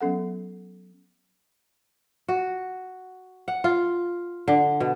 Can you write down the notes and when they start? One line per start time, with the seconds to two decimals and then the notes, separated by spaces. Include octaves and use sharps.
0.01 F#3 B3 C#4 A4 F#5
2.28 F#4
3.48 F#5
3.64 F4
4.48 D3
4.80 B2